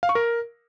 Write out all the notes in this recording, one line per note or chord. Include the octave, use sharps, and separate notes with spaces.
F5
C#6
A#4